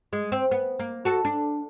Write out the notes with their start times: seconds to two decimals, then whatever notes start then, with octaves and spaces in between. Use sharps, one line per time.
0.13 G#3
0.32 C4
0.51 B3
0.79 A#3
1.05 F#4 A4
1.25 D4